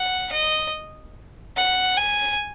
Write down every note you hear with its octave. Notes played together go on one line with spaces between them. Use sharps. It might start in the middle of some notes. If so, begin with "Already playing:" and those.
Already playing: F#5
D#5
F#5
G#5